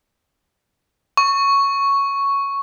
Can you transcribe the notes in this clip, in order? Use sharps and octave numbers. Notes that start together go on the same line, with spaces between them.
C#6